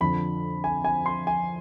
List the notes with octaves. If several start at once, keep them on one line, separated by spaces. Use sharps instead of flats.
F2 D3 F3 B5
G#5
G#5
C6
G#5